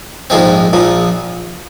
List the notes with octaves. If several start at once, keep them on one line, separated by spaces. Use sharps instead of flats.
A#1 G#2 F3 G#3 C4
A#1 A#2 F3